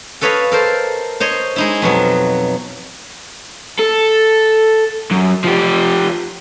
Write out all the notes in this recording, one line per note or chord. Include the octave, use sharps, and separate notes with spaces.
A4 B4 C#5 D#5 F5 B5
A4 A#4 C5
C5 C#5 D#5
G#3 D#4 E4
F2 B2 F#3
A4
F#2
F3 G4